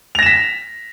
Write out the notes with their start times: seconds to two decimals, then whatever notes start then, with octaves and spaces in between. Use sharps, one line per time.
0.15 F7
0.19 A#6
0.22 E7
0.26 B6